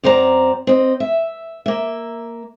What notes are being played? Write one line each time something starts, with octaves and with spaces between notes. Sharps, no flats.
F#2 C4 C5 D5 A#5
C4 D#5
E5
A#3 E5